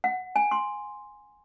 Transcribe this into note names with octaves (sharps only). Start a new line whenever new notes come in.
F#5
G#5
C6